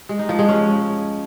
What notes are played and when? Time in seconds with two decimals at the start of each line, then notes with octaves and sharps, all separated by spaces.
0.09 G#3
0.19 D#4
0.29 F3
0.39 G#3
0.49 C#4